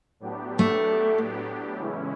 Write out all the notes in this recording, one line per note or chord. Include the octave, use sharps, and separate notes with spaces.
A2 F#3 B3 D4 G4
A3
C#3 E3 G#3 C#4 E4